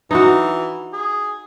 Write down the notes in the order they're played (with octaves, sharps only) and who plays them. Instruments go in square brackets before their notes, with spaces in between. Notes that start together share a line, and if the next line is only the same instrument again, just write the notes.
[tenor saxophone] E3 [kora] D#4 F#4
[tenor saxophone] G#4